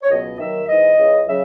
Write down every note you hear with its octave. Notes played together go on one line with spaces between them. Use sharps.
C#5
C#2 B2 F#3 D#5
D#2 D#3 F#3 E5
G#2 E3 D#5
C#2 C#3 E3
C#3 F#3 E5